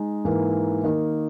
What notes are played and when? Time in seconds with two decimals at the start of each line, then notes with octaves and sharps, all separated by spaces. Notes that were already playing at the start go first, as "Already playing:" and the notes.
Already playing: G#3 D#4
0.25 G#2 E3 A#3
0.84 D#3 A#3 D#4